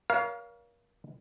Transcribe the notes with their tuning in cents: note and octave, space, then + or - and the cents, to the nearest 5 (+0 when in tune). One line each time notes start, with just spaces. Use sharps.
A#4 +35 C#5 +40 F5 +0